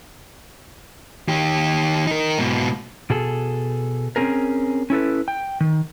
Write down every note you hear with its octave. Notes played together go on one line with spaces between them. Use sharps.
D#3 G4
D#4 A#4
G#2 B2
B2 G#4 A4
C4 C#4 G#4 A#4
C#4 E4 A4 B4
G5
D#3